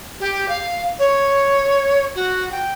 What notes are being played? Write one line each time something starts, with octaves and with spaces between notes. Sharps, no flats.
G4
F5
C#5
F#4
G5